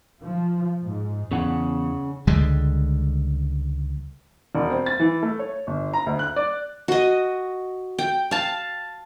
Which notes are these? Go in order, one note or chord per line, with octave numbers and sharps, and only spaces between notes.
F3
G#2
E2 C#3 F#5
C#2 D3 G3 G#3
E1
C4
A6
E3
A3
C#5
G1
A#5
D2
F#6
D5
F#4 D#5
G5
F5 A5